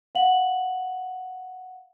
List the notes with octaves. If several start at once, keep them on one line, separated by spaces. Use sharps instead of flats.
F5 F#5 F#7